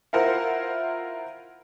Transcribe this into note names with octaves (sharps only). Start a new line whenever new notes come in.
E4 F4 A#4 C5 F#5